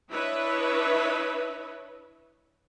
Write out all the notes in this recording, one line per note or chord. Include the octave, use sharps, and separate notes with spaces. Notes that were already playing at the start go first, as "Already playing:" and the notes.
D4 E4 B4 C#5 D#5 E5